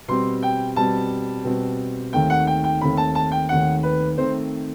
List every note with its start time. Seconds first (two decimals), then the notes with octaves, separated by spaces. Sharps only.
0.08 B2 G3 C4 C6
0.43 G5
0.76 B2 G3 C4 A5
1.44 B2 G3 C4
2.13 D#2 D#3 A3 C4 G5
2.30 F#5
2.47 G5
2.64 G5
2.81 D#2 D#3 A3 C4 B5
2.97 A5
3.15 A5
3.32 G5
3.49 D#2 D#3 A3 C4 F#5
3.83 B4
4.18 D#3 A3 C4 C5